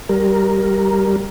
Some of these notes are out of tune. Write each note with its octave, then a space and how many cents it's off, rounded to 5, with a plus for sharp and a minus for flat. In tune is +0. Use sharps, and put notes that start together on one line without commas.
G3 -10 A#4 +5